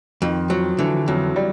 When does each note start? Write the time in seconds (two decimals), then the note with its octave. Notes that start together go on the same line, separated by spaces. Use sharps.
0.22 F2 D#3
0.50 F3 F#3
0.78 D3 E3
1.08 F2 F#3
1.36 G3